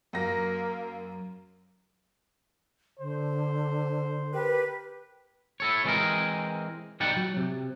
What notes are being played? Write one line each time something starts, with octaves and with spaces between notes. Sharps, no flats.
F#2 A#3 A#6
D3 C5
G4 A#4 B4
E4 A4 C#5
E3 G#3 C4 E4 G#4 A#4
B1 G3 D#4 F#5 G5 A5
F#3
C3